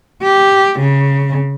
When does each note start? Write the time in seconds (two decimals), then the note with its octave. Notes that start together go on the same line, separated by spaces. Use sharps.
0.23 G4
0.80 C#3